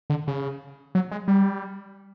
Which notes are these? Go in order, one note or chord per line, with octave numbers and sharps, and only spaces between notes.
D3
C#3
F#3
G#3
G3